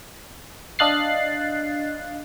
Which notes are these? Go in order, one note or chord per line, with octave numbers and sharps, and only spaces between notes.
D4 D#5 F5 F#6 A6 C7